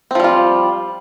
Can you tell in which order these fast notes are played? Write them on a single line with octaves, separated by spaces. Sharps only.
C4 F3 G3 F4